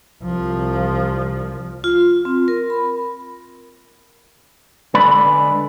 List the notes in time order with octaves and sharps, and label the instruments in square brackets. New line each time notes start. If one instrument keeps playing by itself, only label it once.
[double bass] C2 F3
[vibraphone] F4
C4
A#4
B5
[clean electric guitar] D3 G#3 B4 D5 B5